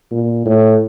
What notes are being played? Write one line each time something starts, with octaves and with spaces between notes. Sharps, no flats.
A#2
A2